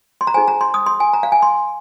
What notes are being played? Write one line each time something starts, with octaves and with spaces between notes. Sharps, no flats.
C6
A#5
D#4 G#4 C5 G#5
A#5
C6
D#6
C6
G#5
A#5
F5
G#5
C6